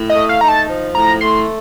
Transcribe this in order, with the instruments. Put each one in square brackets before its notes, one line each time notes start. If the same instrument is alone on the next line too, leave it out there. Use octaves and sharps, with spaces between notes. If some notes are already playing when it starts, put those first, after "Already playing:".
Already playing: [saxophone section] A2
[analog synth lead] D#5
[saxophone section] A3
[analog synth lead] F5
[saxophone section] D#4 [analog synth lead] A#5
[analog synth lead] A5
[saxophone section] F3
[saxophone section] A2 [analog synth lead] A#5
[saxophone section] A3 [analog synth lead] C6